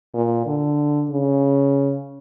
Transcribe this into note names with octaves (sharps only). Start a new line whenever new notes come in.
A#2
D3
C#3